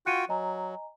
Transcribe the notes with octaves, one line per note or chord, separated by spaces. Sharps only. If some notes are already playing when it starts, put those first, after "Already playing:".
F4 F#4 G5 F#6 C#7 D#7
F#3 D#5 G#5 A#5